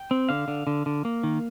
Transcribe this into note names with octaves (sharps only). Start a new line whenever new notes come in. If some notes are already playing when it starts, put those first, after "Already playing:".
Already playing: G5
C4
D3 F5
D3
D3
D3
A#3
D#3